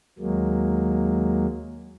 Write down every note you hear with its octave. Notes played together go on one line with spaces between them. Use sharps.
D#2 F#3 G#3 A#3